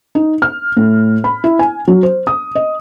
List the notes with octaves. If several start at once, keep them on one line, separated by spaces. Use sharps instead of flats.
D#4
F6
A2
B5
E4
G#5
F#3
C5
D#6
D#5